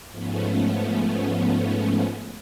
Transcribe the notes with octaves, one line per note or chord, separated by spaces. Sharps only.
G#2 F3 A3 B3 C#4